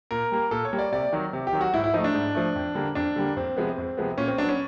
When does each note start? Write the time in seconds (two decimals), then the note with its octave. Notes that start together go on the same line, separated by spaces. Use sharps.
0.11 A#2 A#4
0.32 G3 A#3
0.51 A#2 A4
0.65 C#5
0.72 G3 A#3
0.79 D5
0.92 C3 D5
1.13 D#3 F#3
1.33 C3
1.47 G4
1.53 D#3 F#3
1.61 F#4
1.74 G#2 E4
1.84 E4
1.94 F3 A3 D#4
2.04 D4
2.14 G#2
2.35 F3 A3
2.56 F2
2.75 D3 G3 A#3
2.95 F2 D4
3.16 D3 G3 A#3
3.36 F2 C4
3.56 C3 F3 G#3 B3
3.78 F2
3.97 C3 F3 G#3 B3
4.18 A#2 C#4
4.28 C4
4.38 F#3 B3 D4
4.49 C#4